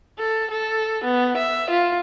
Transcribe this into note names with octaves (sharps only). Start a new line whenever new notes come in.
A4
A4
B3
E5
F4